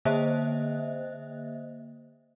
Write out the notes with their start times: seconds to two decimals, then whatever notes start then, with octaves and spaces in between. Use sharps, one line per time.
0.05 D3 A#3 C5 D#5 E5 F#6